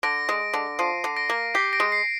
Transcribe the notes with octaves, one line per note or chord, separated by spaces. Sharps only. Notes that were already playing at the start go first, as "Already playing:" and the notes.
D3 A#6 D7
G#3
D3
F3 C7 D#7
D3
A#6 D7
A#3
G4 C7
A#6 D7
G#3
C7